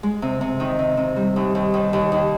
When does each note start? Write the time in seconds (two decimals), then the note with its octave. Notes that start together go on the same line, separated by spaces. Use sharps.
0.03 G#3
0.22 C3
0.41 C3
0.60 D#3
0.79 C3
0.97 C3
1.16 G3
1.36 D#2
1.55 D#2
1.74 D#3
1.93 D#2
2.12 D#2